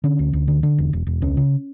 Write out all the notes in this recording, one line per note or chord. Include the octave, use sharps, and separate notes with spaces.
D3 C#4
D2
D2
D3
D3
E1
E1
E1
C#2 C#4
C#3